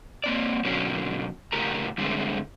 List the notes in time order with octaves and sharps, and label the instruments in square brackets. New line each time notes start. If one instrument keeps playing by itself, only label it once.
[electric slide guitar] A#3 C4 D5
B2 D3 F#3 A#3 C#4 D4
A2 C#3 G4 A#4 A#5
G2 D3 G#3 A3 C4